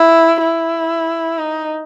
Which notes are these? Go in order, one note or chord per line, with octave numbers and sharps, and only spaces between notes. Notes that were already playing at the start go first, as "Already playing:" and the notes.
Already playing: E4
E4
D#4